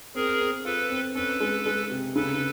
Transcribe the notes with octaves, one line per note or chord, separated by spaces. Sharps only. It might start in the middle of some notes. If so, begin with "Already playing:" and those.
C4 G#4 A#4
C4
F4 A4 B4
C4
C#4 A4 B4
G#3
G#3
C3
C#3 A4 B4